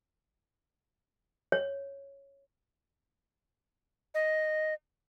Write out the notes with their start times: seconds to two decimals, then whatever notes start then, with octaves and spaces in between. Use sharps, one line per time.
1.52 C#5
4.14 D#5